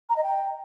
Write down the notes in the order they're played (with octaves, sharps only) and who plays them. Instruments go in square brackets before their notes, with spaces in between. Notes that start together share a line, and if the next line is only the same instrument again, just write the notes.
[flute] A#5
D#5
G5